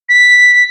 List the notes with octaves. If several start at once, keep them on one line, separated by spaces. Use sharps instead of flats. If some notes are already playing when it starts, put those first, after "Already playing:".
B6